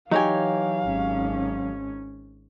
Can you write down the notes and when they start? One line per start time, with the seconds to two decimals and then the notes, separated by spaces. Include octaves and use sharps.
0.11 E3 F#3 D#4 G4 C#5 F5 G#5
0.84 G#1 C#4